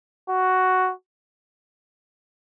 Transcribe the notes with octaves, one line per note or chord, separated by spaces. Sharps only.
F#4